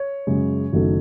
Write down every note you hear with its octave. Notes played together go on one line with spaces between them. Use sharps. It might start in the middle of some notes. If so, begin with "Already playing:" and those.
Already playing: C#5
F#2 C#3 G#3
F#1 F#2 D#3 F#3 A3